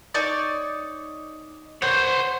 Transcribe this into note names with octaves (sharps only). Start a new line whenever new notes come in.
D#4 C#5 D5
C5 C#5 F#5